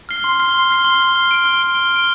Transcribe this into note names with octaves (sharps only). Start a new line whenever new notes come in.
F6 C7 G7
C6
F6 C7 G7
C6
F6 C7 G7
C6
F6 C7 G7
F6
D7 G7
F6
D7 G7
F6
D7 G7